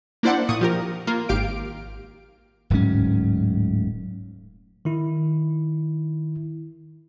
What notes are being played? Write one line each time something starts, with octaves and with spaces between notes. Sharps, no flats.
A#3 D4 E4 C5 D5 F#5
A#2 C#6 D#6
F3 G4 A#4
A#3 F4
G#1 G4 F5 D7
D1 G#2 F#3 C#4
D#3 E4